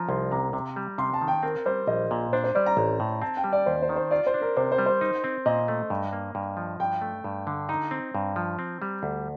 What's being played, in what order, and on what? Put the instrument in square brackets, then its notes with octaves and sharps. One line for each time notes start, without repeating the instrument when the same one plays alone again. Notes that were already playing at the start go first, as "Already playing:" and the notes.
Already playing: [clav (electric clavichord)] F3 [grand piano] A#5
[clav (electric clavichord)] C2 [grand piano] C6
[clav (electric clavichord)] C3 [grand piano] A#5
[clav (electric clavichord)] C3
G3
[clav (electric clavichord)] C3 [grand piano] C6
[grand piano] A5
[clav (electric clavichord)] D#3
[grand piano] G5
[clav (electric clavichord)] C4 [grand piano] A#4
[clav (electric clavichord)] G3 [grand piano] C5
[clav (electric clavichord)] A#1 [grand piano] D#5
[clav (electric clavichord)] A#2
[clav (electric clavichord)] D4 [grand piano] C5
[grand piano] C5
[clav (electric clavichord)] G3 [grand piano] D5
[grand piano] A#5
[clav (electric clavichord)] A1
A2
[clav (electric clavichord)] C4 [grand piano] A5
[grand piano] G5
[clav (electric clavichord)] G3
[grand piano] D5
[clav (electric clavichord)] D#2 [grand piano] C5
[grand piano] C5
[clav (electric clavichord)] D#3
[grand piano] C5
[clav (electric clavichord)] F4 [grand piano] D5
[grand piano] C5
[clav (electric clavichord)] D4
[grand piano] A#4
[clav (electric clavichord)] C3 [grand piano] C5
[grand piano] C5
[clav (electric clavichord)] G3
[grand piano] C5
[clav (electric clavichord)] D#4
C4
[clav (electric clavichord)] A#2 [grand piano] D#5
[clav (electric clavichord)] A3
G2
A#3
G2
F3
[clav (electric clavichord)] G2 [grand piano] G5
[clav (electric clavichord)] A3
G2
D3
[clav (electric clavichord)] D#4 [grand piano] A#5
[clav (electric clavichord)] C4
G2
F3
C4
G3
D2